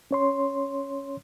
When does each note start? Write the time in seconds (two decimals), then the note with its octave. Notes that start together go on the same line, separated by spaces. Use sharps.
0.11 C#4 C#5 C6